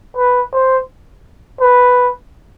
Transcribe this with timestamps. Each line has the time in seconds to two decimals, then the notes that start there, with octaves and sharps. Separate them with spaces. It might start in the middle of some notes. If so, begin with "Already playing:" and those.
0.17 B4
0.53 C5
1.60 B4